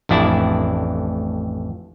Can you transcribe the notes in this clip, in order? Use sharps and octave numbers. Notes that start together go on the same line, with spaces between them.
A1 F2 D4 E4 D5 A5